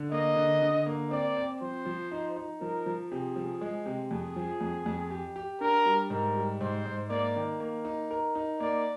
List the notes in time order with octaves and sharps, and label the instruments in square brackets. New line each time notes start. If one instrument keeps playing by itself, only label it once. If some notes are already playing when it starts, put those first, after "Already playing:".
Already playing: [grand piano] D3
[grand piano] A#3 [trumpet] D#5
[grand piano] D3
D3
A#3
[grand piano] C4 [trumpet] D5
[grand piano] C4
[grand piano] F3 [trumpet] C5
[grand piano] F3
D#4
D#4
[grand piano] F3 [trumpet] A#4
[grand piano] F3
[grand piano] C3 [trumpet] G#4
[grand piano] F3
G#3
C3
[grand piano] F2 [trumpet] G#4
[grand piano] F3
F2
F2
G4
G4
[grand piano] D4 [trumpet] A#4
[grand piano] G3
[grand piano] G#2 [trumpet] A#4
[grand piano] G3
[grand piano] G#2 [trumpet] C5
[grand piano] G#2
[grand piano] A#3 [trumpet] D5
[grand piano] D#3
A#3
D#4
A#4
D#4
[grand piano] A#3 [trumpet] D5